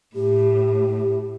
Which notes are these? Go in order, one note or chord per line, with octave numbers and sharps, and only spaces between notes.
A2 G4